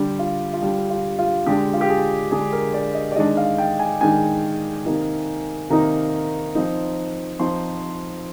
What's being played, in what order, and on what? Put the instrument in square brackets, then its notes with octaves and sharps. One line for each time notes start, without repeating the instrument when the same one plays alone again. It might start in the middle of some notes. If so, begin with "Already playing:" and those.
Already playing: [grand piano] D3 G3 D4 G4
F4
F4
D3 G3 D4 G4
F4
F4
D3 G#3 D4 G4
F4
G4
G#4
D3 G#3 D4 G#4
A#4
D5
D#5
D5
D#3 G#3 D4 D#5
F5
G5
G#5
D#3 G#3 D4 G#5
C3 D#3 A#3 D#4
C3 D#3 A#3 D#4 A#5
F3 C4 D#4
F3 C4 D#4 C6